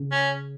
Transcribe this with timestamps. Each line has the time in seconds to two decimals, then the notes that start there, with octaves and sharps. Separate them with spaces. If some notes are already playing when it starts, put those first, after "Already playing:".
Already playing: C#3
0.11 C#4